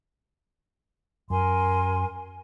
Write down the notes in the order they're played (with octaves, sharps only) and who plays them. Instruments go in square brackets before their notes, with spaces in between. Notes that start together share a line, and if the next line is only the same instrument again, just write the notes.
[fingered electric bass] F#2 [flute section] A#4 G#5 C6